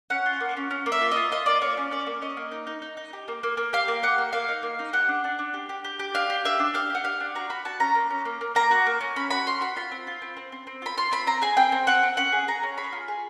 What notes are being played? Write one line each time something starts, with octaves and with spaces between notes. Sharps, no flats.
C#4 F#5
F4
A#3
C#4
C#4
A#3
E5
F4
F4 D#5
F4 D#5
A#3 D5
A#3 C#5
C#4
C#4 D5
A#3
C#4 D#5
A#3
D#4
D#4
D#4
D#4
G4
A#3
A#3
A#3
G4 F5
A#3
G4 F#5
A#3
A#3 F5
D#4
A#3
D#4
G4 F#5
D4
D4
D4
G4
G4
G4
G4
D4 F5
G4
D4 E5
D4
G4 F5
G4 F#5
G4 F5
D4
F#4 A#5
F#4 B5
F#4 A5
C#4 A#5
A#3
C#4
A#3
A#3
A#3 A#5
F#4
A#3
C#4
C#4 B5
F#4 B5
C#4 C6
F#4 B5
F4 B5
C4
F4
C4
C4
C4
C4
F4 B5
F4 C6
C4 B5
C4 A#5
G#4 G#5
C4 G5
C4
C4 F#5
C4
C#4 F#5
G#4
G#4 A#5
C#4
G#4 B5
F4
G#4